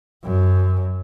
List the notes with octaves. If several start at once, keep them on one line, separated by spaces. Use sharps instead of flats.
F#2